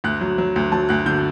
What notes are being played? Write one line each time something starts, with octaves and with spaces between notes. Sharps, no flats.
D2 F#6
F#3
F#3
D2
F#3 A5
D2 F#6
D3 G6